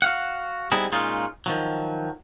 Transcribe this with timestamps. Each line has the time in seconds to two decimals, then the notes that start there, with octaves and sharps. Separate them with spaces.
0.02 F#4 F5 F#5
0.72 G3 B3 C4 D#4 E4 G#4
0.92 A#2 G#3 C#4 D#4 F4
1.46 D#3 F3 F#3